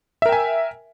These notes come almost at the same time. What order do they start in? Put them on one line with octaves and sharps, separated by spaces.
E5 A#4 G5 G#5